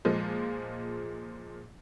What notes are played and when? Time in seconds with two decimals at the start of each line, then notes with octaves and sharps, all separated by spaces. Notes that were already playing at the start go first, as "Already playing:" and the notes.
0.05 A#2 F3 G#3